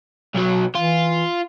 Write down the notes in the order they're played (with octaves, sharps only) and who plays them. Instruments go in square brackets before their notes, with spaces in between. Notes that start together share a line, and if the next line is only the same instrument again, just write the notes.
[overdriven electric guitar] B1 F#3
[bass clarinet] E3 [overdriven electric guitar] F4